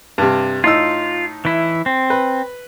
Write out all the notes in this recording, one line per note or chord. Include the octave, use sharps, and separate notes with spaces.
G2 C3
A2 D#4 F4 E6
E3 E4
C4
B4